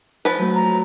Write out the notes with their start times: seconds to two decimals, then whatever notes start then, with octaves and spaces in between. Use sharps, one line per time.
0.25 F3 B4
0.39 F#3 A3
0.55 A#5